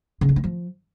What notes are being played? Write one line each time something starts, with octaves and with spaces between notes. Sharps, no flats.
C#3
D4
A3
F3